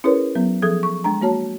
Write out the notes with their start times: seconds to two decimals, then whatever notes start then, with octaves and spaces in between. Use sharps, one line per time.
0.04 C#4 E4 G#4 A#4 B4 C#5
0.35 F#3 B3
0.62 F3 G#4 A4 D#6 G#6
0.83 C#6
1.04 G#3 D4 A#5
1.22 A#3 F#4 C#5 A5